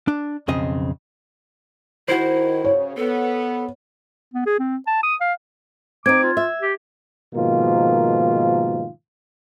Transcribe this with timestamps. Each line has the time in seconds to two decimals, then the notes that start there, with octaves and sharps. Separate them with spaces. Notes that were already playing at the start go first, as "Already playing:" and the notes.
0.08 D4
0.48 B1 F2 C#3 C4 D#5
2.08 D#3 E4 F#4 C5
2.65 C#3 C#5
2.97 B3 A4
4.34 B3
4.46 G#4
4.59 C4
4.87 A5
5.03 D#6
5.21 F5
6.06 C4 D#4 D6 G#6
6.23 F4
6.37 E5
6.62 G4
7.34 G#2 B2 D#3 F3 A#3 F4